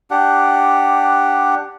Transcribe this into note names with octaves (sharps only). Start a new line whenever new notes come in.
D4 G4 F#5